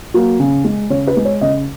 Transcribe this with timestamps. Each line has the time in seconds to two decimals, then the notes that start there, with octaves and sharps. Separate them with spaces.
0.14 F#3 A#3
0.40 C#3
0.64 G#3
0.90 C#3 C#5
1.07 B4
1.17 G#3
1.25 C#5
1.41 C#3 D#5